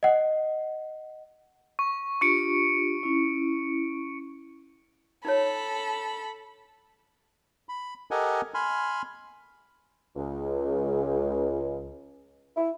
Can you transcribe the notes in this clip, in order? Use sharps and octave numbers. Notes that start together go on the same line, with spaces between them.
D#5 F#5
C#6
D4 F4 G4 C#6 C#7 D7
C#4 E4
D#4 F4 A4 C#5 B5
B5
G4 A4 A#4 D#5 F#5 G#5
G#5 B5 C6 F6
C#2
E4